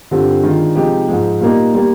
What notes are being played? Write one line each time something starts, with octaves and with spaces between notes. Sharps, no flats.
G2 D3 G3 C4 F4
D#3 G#3 D4 F4
C3 F3 G#3 D#4 G4
G#2 F3 G#3
A#2 G3 A#3 D#4
G3 A#3